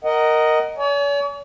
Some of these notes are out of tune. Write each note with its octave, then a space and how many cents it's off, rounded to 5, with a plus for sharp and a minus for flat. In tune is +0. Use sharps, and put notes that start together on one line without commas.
A#4 +0 D#5 +0 F#5 +25
C#5 +45 G#5 +25